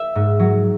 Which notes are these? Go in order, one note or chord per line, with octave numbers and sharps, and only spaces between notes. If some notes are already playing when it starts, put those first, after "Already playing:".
Already playing: E5
G#2
F#3